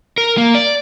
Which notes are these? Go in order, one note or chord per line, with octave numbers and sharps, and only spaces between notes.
A#4
A#3
D5